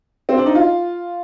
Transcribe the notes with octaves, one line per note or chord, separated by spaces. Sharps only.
C4
D4
D#4
F4